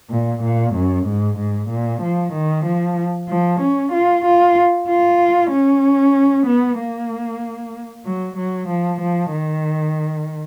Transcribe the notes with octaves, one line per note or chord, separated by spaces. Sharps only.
A#2
A#2
F#2
G#2
G#2
A#2
F3
D#3
F3
F3
C#4
F4
F4
F4
C#4
B3
A#3
F#3
F#3
F3
F3
D#3